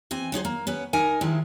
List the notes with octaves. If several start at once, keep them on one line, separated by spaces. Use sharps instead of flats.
E3 C4 G#5
F#3 D#4 G#4 C5
A#3
B3 C#4 B4
D#4 A#4 G#5
D#3 F3 G#3 E4